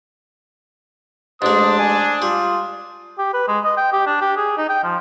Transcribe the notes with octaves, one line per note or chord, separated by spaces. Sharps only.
A1 G#3 D4 C5 D#6
G#5 D#6
G3 F4
G4
B4
G#3
D#5
G5
G4
D4
G4
G#4
D#4
G5
F3